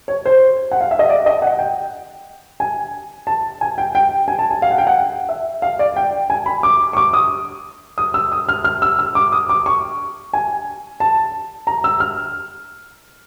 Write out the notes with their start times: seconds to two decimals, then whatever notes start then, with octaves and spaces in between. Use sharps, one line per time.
0.08 C#5
0.26 C5
0.71 F#5
0.81 F5
0.91 E5
0.99 D#5
1.09 D5
1.26 D#5
1.42 F#5
1.59 G5
2.60 G#5
3.27 A5
3.61 G#5
3.78 G5
3.95 G5
4.28 G#5
4.39 A5
4.51 G#5
4.62 F5
4.71 F#5
4.78 G5
4.87 F#5
5.29 E5
5.62 F5
5.79 D5
5.96 G5
6.30 G#5
6.46 B5
6.63 D6
6.93 C#6
6.97 D6
7.13 D#6
7.98 D#6
8.14 E6
8.32 D#6
8.49 F6
8.64 F6
8.82 E6
8.99 E6
9.15 D6
9.32 D#6
9.49 D6
9.66 C#6
10.33 G#5
11.00 A5
11.67 A#5
11.84 E6
12.00 F6